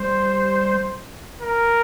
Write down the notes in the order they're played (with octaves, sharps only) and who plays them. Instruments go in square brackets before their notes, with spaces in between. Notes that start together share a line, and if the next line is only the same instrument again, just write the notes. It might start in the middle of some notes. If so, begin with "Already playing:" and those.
Already playing: [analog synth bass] G3 [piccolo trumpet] C5
[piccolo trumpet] A#4